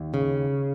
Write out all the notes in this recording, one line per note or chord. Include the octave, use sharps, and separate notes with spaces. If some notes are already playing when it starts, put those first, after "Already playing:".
Already playing: D#2
C#3